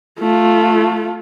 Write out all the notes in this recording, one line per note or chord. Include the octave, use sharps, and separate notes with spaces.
A3 F4